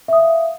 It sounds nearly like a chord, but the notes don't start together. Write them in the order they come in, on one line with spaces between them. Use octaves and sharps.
E5 D#6 F5